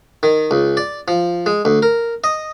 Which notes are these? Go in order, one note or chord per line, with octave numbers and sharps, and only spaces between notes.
D#3
C#2
D5
F3
G#3
D2
A#4
D#5